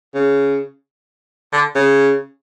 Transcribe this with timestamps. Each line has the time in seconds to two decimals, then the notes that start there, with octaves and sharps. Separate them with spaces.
0.15 C#3
1.52 D3
1.75 C#3